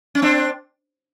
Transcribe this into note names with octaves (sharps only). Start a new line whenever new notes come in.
C#4
C4 D4